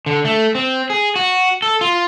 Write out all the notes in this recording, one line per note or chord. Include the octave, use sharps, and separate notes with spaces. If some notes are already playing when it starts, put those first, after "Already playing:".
D3
A3
C4
G#4
F#4
A4
F4